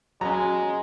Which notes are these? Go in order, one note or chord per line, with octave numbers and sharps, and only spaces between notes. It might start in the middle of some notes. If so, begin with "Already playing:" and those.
F#3 G#3 C#4 A#5